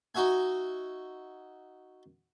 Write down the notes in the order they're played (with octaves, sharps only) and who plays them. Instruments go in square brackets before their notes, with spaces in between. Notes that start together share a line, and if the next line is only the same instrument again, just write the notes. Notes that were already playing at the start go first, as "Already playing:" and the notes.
[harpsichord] D#4 F#4 E5 G#5